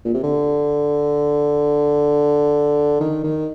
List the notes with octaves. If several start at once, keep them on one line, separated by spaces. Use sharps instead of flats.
A#2
C3
D3
D#3
D#3